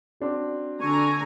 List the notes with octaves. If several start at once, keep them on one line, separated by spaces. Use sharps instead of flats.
C4 D4 F#4
D3 G#5 A#5 C#6